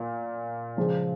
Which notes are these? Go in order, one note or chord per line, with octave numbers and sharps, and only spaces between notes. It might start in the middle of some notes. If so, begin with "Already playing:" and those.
Already playing: A#2
C#3 F3 G#3